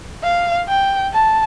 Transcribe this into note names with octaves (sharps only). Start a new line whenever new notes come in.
F5
G5
A5